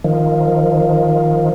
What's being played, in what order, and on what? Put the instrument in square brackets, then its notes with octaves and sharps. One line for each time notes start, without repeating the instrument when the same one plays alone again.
[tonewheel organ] D#3 F3